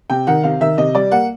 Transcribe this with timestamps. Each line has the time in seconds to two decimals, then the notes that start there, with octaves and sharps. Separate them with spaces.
0.10 C3 G5
0.27 D#3 F#5
0.43 C3 F5
0.61 D#3 E5
0.77 C3 D#5
0.95 G3 D5
1.11 A#3 F#5